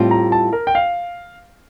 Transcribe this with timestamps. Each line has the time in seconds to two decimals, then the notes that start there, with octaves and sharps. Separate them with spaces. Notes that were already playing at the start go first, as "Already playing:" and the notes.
Already playing: A2 G3 C4 F4
0.11 A#5
0.32 A5
0.53 A#4
0.67 G5
0.75 F5